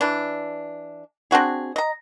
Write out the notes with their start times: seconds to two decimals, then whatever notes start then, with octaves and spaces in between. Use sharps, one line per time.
0.01 E3 D4
1.31 C4 D4 F#4 G#4
1.76 D#5 A#5